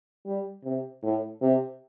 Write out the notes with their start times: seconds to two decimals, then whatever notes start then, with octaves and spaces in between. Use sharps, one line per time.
0.26 G3
0.64 C3
1.03 A2
1.41 C3